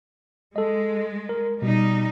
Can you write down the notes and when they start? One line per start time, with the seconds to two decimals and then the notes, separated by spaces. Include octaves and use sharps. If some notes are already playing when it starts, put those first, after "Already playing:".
0.56 G#3 A4 D#5
1.29 A#4
1.62 B2 G3 D#4